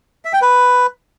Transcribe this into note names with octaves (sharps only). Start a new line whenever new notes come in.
E5
G5
B4